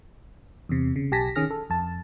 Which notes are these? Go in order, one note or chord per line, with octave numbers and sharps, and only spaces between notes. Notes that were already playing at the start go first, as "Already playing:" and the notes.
E2 C3
C#3
B1 G4 G#5 A5 A#6 B6
D#3 C#4 G#4 F6 A#6
A4
F2 A5